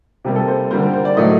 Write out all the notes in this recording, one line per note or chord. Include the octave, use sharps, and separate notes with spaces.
C3 G3 A#3 G4
A4
C5
D3 G3 A#3 C5
A#4
C5
D5
A2 F#3 A3 D#5